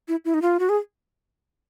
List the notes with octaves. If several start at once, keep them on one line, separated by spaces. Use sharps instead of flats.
E4
E4
D#4
F4
F#4
G#4